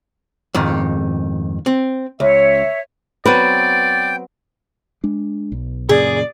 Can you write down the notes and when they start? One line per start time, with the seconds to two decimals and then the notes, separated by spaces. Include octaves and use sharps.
0.54 F2 G#2 D#3
1.66 C4
2.20 C#2 C#5 E5
3.26 F#3 B3 C4 B4 D5 G5
5.04 G#3 D4
5.52 B1
5.89 F#2 A#2 C#3 G#4 D5